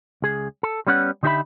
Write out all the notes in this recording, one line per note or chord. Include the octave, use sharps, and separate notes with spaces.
C#2 G#4
A4
G3 B3 C#4 C#5 F#5
D3 D#4 G4 G#4 E5 B5